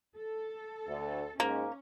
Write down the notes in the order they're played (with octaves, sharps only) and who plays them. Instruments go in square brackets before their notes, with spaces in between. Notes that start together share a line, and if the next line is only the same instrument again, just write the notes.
[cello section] A4
[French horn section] D2
[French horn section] G#2 [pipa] A#3 [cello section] C#4